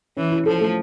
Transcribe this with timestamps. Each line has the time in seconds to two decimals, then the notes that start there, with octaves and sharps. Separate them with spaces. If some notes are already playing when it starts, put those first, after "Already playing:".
0.17 E3 C#4
0.32 E4
0.46 F3 A4
0.61 A3